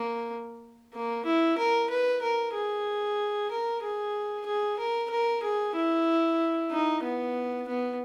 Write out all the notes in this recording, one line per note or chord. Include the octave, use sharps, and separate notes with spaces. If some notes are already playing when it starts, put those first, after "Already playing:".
Already playing: A#3
A#3
E4
A#4
B4
A#4
G#4
A#4
G#4
G#4
A#4
A#4
G#4
E4
D#4
B3
B3